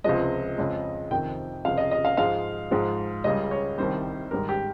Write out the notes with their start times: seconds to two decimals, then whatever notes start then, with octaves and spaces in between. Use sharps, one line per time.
0.04 C#2 C3 F3 G#3 D#5
0.58 F2 C#3 G#3
1.11 F2 C3 D#3 G5
1.65 C#2 C3 F3 G#3 F5
1.78 D#5
1.91 D#5
2.05 F5
2.17 G#2 F3 G#3 F5
2.71 G#2 F3 G#3
3.24 C#2 C#3 G3 D#5
3.51 C#5
3.78 C2 C3 D#3 G3 C5
4.31 G#2 D#3 G3 A#4
4.49 G4